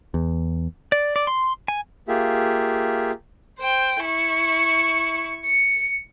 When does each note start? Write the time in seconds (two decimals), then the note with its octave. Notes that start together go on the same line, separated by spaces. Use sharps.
0.14 E2
0.92 D5
1.16 D5
1.27 C6
1.68 G#5
2.08 A#3 F4 G4 G#4 E5
3.58 C5 G5
4.02 E4 C#6
5.45 C#7